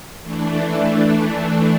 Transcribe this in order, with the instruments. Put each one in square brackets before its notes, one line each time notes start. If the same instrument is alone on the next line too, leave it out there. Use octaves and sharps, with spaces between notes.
[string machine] E3 A3 D4